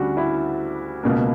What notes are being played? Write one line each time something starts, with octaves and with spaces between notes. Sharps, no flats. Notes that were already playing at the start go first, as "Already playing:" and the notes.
Already playing: D2 C#3 G3 D4 F#4 G4
E4
C#2 B2 A#3